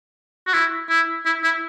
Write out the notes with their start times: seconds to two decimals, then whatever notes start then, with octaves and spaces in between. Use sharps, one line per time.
0.47 F#4
0.53 E4
0.89 E4
1.26 E4
1.44 E4